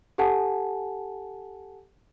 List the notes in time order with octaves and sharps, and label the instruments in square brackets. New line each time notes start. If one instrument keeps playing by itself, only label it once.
[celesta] G4 A4 F#5 G#5 A5